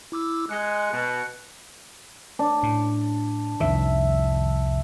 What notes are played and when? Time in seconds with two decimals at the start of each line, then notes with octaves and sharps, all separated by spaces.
0.12 E4 D6 E6
0.49 G#3 F#6 C#7
0.92 B2
2.39 D4
2.63 A2
3.60 C2 F2 D#3 E5